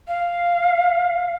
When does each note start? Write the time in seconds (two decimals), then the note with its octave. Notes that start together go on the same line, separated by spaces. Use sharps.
0.08 F5